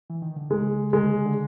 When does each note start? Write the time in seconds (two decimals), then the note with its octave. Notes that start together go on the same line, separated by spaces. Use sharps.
0.10 E3
0.22 D#3
0.36 D3
0.50 C#3 G#3
0.93 D3 G#3
1.26 D3